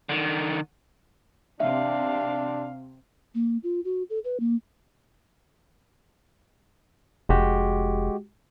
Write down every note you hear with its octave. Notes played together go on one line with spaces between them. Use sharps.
D3 D#3
C3 C4 D4 E5 F5
A#3
F4
F#4
A4
B4
A#3
F1 G#3 F#4 G4